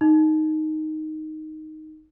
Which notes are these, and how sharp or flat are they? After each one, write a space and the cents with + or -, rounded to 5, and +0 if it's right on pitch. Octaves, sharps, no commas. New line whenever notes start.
D#4 +0